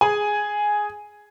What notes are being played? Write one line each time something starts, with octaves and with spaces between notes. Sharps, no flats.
G#4 G#5